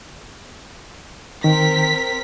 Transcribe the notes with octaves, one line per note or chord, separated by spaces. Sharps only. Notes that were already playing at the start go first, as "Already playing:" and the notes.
D#3 C4 A#4 B6